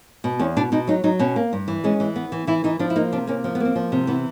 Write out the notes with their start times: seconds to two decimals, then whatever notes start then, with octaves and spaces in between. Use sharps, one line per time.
0.24 B2
0.39 E2 C#4
0.57 B2 D4
0.72 B2 D#4
0.87 F#3 D#4
1.04 F#3 D#4
1.19 B2 C#4
1.36 A#3
1.53 G2
1.68 E3
1.84 G#3 C#4
2.00 E3
2.16 B3
2.32 E3
2.47 E3 E4
2.64 E3 D#4
2.79 F3 D4
2.90 E4
2.96 A#3 D#4
3.12 C3 D4
3.27 A#3 C#4
3.44 F3 C4
3.55 B3
3.60 A#3 C4
3.75 F3
3.92 C3
4.07 E3 B3